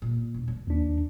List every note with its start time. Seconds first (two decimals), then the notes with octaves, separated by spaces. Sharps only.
0.02 A#2
0.34 E1
0.48 C#2
0.67 D#2 D4